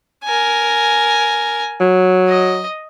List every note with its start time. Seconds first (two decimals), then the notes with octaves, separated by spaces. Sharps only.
0.24 A#4 G#5
1.80 F#3
2.28 D#5